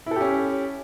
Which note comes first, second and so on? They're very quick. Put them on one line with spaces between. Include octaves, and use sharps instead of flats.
E4 A4 G4 C#4